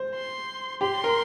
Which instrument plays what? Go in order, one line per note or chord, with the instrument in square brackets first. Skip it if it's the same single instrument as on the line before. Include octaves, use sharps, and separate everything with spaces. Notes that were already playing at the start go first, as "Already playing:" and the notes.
Already playing: [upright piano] C5
[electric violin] C6
[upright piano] G4 [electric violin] C6
[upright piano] A#4